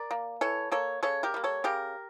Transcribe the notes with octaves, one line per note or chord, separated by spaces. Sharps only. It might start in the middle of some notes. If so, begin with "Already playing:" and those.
Already playing: A#4 D5
A#3
E3 A4 C#5
A#3 A4 C#5
C#3 A4 C#5
G4 A#4
G3 A#3
A4 C#5
C#3 G4 A#4